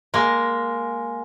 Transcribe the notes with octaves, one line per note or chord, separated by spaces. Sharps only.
G#3 A#3